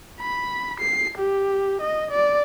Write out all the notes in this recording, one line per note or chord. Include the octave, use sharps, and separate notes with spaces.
B5
C7
G4
D#5
D5